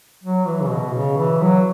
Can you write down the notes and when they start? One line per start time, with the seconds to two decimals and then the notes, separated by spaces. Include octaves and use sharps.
0.24 F#3
0.47 E3
0.61 C#3
0.70 B2
0.93 C#3
1.17 E3
1.41 F#3